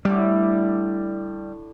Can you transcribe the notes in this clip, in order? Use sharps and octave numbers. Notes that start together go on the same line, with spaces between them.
A2 D3 G3 D6